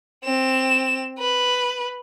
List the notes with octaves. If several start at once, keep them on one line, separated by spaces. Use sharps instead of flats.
C4 E7
B4